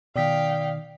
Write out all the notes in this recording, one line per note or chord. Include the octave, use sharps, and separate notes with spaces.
B2 D#3 D5 F5 G5 D#6 B6